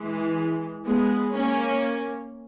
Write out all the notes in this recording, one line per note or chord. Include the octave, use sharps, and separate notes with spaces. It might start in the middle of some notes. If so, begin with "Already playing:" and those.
Already playing: E3 G#3
G#3 B3
A#3 C#4